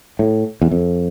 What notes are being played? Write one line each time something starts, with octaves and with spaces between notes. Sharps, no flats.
A2
E2
F2